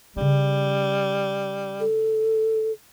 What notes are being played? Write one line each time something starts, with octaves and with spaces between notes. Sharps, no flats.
C#3 G3 C#4
A4